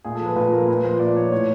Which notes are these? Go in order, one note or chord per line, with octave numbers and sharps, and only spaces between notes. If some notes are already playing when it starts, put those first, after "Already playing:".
A#2 G#4
A4
F3 B4
A#2 B4
F3 A#4
A#2 B4
F3 C5
A#2 D5
F3 C#5
A2 C#5